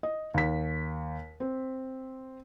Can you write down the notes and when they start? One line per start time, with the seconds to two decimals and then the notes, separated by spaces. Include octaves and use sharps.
0.03 D#5
0.34 D#2 B6
1.40 C4